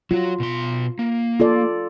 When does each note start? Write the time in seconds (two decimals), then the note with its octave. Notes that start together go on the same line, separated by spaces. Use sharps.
0.11 F#3 F4 F#4
0.40 B2 C6
0.99 A#3
1.40 F4 A4 D5